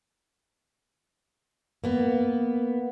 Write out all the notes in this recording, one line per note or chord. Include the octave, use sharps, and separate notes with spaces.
A#3 B3